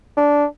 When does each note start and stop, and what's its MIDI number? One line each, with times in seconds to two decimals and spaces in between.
0.17 0.45 62